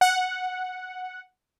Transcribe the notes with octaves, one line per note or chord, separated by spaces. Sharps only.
F#5